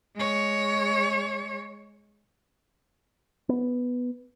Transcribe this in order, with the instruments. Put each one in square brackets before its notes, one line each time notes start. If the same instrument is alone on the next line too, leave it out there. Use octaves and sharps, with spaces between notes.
[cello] G#3 C#5
[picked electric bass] B3